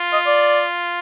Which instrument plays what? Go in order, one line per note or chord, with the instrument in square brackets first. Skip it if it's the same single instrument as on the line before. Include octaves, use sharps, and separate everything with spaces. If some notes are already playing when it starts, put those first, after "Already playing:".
Already playing: [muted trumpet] F4
[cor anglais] D#5
D5